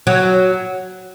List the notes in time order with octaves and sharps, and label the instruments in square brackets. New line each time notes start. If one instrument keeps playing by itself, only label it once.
[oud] F#3